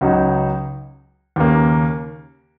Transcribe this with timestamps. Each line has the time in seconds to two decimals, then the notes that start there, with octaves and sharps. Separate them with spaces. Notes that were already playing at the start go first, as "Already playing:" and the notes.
0.01 C#2 C#3 F#3 D#4
1.36 D#2 C#3 A#3